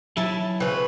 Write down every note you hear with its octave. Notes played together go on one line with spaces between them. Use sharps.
E3 F#3 E4 A5
C#3 C4 B4